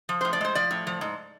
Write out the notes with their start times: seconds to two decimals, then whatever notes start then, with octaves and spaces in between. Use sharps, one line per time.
0.09 F3
0.21 A2 C5
0.33 D5
0.41 G#3 C5
0.55 F3 D5
0.71 A2
0.87 F3
1.01 G#2